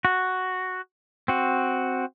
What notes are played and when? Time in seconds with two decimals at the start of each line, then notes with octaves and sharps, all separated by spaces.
0.05 F#4
1.28 C4 F#4